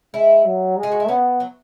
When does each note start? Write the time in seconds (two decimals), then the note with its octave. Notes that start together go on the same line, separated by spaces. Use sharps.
0.14 G#3 E4
0.46 F#3
0.77 G#3
0.83 G#4
0.92 F#4
1.00 E4
1.08 B3 C#4
1.40 F#3